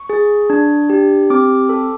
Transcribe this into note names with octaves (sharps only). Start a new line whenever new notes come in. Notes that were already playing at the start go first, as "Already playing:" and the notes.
Already playing: C#6
G#4
D4
G4
C4 D6
A4